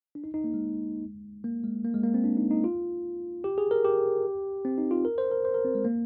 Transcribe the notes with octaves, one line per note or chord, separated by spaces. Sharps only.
D4
D#4
D#4
A#3
G#3
A#3
G#3
A#3
G#3
A#3
C4
D4
D#4
D#4
F4
G4
G#4
A#4
G4
C4
D#4
F4
A#4
C5
A#4
C5
A#4
C4
G#3
A#3